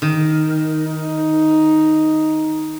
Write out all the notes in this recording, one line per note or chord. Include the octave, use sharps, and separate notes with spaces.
D#3
D#4